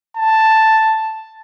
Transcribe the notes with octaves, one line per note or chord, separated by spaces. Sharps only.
A5